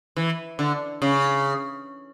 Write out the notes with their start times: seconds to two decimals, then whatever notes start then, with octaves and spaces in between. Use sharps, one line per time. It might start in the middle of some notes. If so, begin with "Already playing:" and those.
0.17 E3
0.59 D3
1.02 C#3